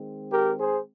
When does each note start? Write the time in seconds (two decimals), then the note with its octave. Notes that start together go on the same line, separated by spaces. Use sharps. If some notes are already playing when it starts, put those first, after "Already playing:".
Already playing: D#3 G#3 C4
0.32 G4 A#4
0.60 G#4 C5